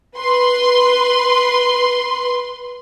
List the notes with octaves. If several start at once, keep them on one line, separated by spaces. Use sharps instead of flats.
B4 C6